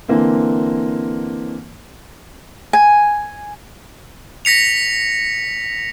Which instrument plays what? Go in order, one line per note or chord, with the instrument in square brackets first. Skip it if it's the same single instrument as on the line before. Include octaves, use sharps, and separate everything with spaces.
[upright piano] D3 E3 A#3 C4
[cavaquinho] G#5
[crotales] A#6 B6 C#7 F7